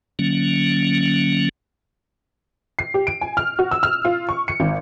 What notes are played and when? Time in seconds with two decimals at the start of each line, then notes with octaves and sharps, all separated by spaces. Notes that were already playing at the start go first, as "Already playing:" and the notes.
0.19 D3 F#3 A#3 C#4
2.79 C7
2.94 G4
3.07 D7
3.21 G#5
3.37 F6
3.59 F#4
3.71 E6
3.83 F6
4.05 F4
4.29 C#6
4.48 C#7
4.60 G#1